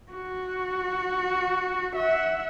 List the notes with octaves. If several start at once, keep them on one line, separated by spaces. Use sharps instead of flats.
F#4
E5 F#5